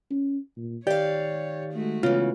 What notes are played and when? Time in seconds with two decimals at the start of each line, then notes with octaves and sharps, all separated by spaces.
0.11 C#4
0.57 A#2
0.87 D#3 G4 C#5 D5 F5
1.73 G#3 A3 F#4
2.03 C#3 E3 B3 F4